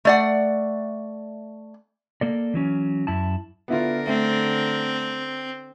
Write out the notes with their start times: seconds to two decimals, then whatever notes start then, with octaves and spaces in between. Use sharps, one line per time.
0.05 A3 D5 F#5
2.21 A#3 A4 D5
2.54 E3 F#3 C#4
3.07 F#2 E4 A5
3.68 D3 B3 E4 F4 A#4
4.07 A3 C4